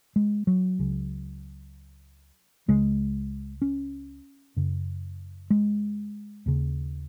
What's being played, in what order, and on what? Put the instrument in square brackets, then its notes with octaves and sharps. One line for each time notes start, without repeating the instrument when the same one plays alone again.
[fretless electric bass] G#3
F#3
C#2 C#3
C#2 C#3 G#3
C#4
F#2 C#3
G#3
D#2 C#3